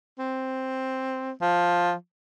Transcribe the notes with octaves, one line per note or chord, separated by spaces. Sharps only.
C4
F3